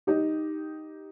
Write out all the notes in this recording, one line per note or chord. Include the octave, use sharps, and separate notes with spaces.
D#4 G4